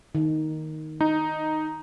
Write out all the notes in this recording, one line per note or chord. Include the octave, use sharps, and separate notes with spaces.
D#3
D#4